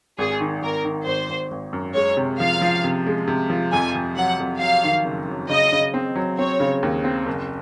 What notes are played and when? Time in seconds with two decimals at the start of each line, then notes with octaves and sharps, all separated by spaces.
0.18 G#1 G#4
0.40 D#3
0.62 G#1 A#4
0.85 D#3
1.06 G#1 C5
1.29 G#1
1.51 G#1
1.73 F#2
1.95 G#3 C#5
2.17 C3
2.39 F3 F5
2.61 F3
2.84 C3
3.06 G#3
3.28 C3
3.50 F3
3.72 F2 G#5
3.95 F2
4.17 F#3 F#5
4.39 F2
4.61 F#3 F5
4.84 D#3
5.05 F#1
5.28 F#3
5.49 C#3 D#5
5.72 C#3
5.94 C4
6.16 F#3
6.38 C4 C#5
6.60 C#3
6.83 D#2
7.04 C4
7.26 F#1